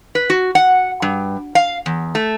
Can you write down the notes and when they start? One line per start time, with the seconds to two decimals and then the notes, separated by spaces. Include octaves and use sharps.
0.15 B4
0.30 F#4
0.55 F#5
1.02 G2
1.55 F5
1.86 E2
2.15 A3